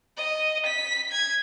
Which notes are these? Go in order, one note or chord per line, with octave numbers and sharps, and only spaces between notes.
D#5
B6
G#6